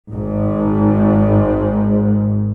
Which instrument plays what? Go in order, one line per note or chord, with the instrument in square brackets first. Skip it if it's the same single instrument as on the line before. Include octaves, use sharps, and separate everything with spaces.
[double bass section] G#1 G#2